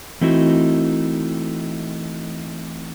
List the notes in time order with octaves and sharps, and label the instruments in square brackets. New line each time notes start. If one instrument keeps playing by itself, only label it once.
[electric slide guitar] E3 A3 C4 D#4 E4 F#4